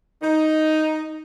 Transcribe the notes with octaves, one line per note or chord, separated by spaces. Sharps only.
D#4